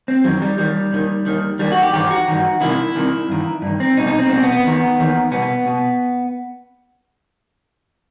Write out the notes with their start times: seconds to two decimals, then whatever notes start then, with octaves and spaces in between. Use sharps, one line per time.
0.08 C4
0.24 F#2 D#3 F#3
0.42 G3
0.58 D#2 D#3 G3
0.92 D#2 D#3
1.26 D#2 D#3
1.59 D#2 D#3 G3
1.72 F#4
1.83 G4
1.93 G2 D#3 G4
2.11 F#4
2.28 G2 D#3
2.61 C2 C3 D#3 E4
2.95 C2 C3 D#3
3.29 G2 D#3
3.62 G2 D#3
3.80 C4
3.97 C2 B2 D#4
4.07 D#4
4.19 C4
4.30 C2 B2 C4
4.42 B3
4.52 B3
4.64 D#2 D#3
4.98 D#2 D#3
5.32 C2 B2 B3
5.66 B2